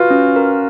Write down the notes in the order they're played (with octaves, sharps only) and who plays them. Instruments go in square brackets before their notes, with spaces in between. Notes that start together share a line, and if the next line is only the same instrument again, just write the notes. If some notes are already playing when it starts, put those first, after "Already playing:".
Already playing: [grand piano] F4 F#4 [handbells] B4
[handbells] C#4
A#4